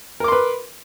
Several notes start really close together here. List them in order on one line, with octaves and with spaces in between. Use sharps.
A#4 D6 C6 B4